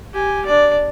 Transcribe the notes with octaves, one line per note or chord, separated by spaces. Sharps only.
G4 G#5
D4 D5